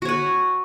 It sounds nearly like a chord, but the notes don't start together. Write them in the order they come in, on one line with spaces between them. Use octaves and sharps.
F#4 C#5 B4